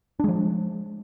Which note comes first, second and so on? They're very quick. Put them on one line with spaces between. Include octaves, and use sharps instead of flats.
D4 G#3 F3